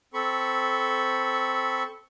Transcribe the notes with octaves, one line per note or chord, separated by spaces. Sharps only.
C4 A4 B5 C#6